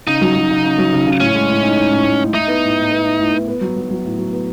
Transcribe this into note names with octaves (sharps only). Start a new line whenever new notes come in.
C#3 D#4
F#3
F#3
C#3
C#3
F#3
C#3
C#3
A2 C#4
G#3
A2
D#4
D#4
A2
A2
A2
D#4 E4
B3
A2
A2
B3
E4
A2
B3
B3
F#3
F#3
F#3
A2
F#3
B3